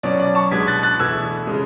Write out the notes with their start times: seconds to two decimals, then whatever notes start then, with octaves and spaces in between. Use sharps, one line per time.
0.03 B2 F#3 C#4 D5
0.20 D5
0.35 A5 C#6
0.51 B2 G#3 D4 G#6 B6
0.67 F#6 A6
0.83 F#6 A6
0.99 E2 B2 A3 E6 G#6
1.47 C#3 G#3